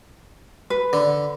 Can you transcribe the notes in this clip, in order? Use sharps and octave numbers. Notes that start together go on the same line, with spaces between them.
B4
D3